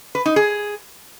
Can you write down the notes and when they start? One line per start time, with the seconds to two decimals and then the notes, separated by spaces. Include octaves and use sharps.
0.15 B4
0.26 D#4
0.36 G#4